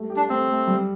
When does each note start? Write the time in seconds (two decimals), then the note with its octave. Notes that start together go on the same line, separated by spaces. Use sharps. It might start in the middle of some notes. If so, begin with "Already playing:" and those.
Already playing: G3 A3
0.10 G4
0.16 D4
0.29 A3 C4
0.48 A3
0.68 G3